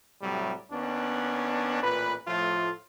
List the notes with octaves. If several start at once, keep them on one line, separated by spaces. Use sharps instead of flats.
A2 C3 F#3 G3
D#2 B3 C#4 D4
A1 A#2 B4
A2 F3 A3 F4